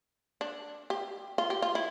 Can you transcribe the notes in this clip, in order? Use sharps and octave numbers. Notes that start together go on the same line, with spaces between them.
D4
G4
F4
G4
F4
E4